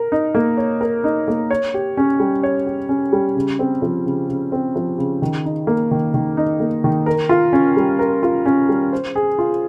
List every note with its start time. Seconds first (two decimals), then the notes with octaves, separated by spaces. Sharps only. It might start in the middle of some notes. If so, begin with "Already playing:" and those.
Already playing: A#4
0.12 D#4
0.35 A#3
0.57 C#5
0.81 A#4
1.04 D#4
1.28 A#3
1.51 C#5
1.74 G4
1.97 C#4
2.19 G3
2.43 C#5
2.67 G4
2.89 C#4
3.12 G3
3.35 C#3
3.59 C4
3.82 F3
4.06 C#3
4.29 C#3
4.52 C4
4.76 F3
4.98 C#3
5.22 D#3
5.45 D#4
5.67 A#3
5.91 D#3
6.14 D#3
6.37 D#4
6.60 A#3
6.84 D#3
7.06 A#4
7.29 F4
7.53 C#4
7.77 G3
7.99 A#4
8.23 F4
8.46 C#4
8.69 G3
8.93 C5
9.16 G#4
9.39 F4